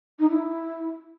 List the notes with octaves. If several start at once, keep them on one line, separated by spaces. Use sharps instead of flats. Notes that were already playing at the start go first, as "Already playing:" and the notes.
D#4
E4